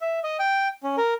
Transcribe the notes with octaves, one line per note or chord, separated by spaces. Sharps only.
E5
D#5
G5
C#4
A#4